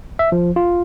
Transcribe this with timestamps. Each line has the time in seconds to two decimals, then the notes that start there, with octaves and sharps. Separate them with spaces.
0.19 E5
0.32 F3
0.56 F4